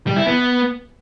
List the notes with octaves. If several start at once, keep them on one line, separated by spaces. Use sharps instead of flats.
G3
E4
B3